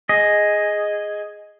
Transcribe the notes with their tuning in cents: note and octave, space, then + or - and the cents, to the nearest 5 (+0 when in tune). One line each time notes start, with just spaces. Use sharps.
G#4 +0 D#5 +0